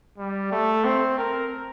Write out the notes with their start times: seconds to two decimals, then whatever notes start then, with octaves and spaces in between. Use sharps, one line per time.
0.18 G3
0.51 A3
0.84 C4
1.18 A#4